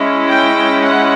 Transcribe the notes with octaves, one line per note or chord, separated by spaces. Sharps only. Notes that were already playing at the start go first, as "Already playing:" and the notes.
Already playing: G#3 C#4 E4
G5
F#5